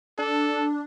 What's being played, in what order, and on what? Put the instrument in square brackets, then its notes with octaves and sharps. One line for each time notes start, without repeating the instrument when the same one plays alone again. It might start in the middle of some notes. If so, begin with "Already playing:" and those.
[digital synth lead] D4 [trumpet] A4